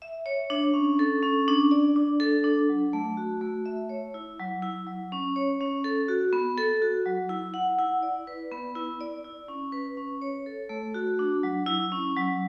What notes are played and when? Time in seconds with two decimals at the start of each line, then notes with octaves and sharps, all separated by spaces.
0.02 E5
0.26 C#5
0.50 D4
0.74 C#4
0.99 A4
1.23 C#4
1.48 D4
1.71 D5
1.96 D4
2.20 A4
2.44 D4
2.69 F#3
2.93 A3
3.17 F#4
3.41 A3
3.66 E5
3.89 C#5
4.14 E4
4.39 F#3
4.62 E4
4.87 F#3
5.12 C#4
5.36 C#5
5.61 C#4
5.84 A4
6.08 F#4
6.33 B3
6.58 A4
6.82 F#4
7.06 F#3
7.29 E4
7.54 F#5
7.79 E4
8.03 D5
8.27 B4
8.51 B3
8.75 E4
9.01 D5
9.24 E4
9.49 C#4
9.72 B4
9.97 C#4
10.22 C#5
10.46 A4
10.69 A3
10.94 F#4
11.19 D4
11.43 F#3
11.67 E4
11.92 C#4
12.16 F#3